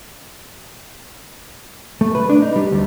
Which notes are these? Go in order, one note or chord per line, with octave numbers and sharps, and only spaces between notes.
A3
B4
D4
D#4
G3
D2